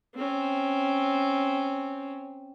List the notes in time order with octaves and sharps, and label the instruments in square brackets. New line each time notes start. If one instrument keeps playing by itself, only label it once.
[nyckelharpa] C4 C#4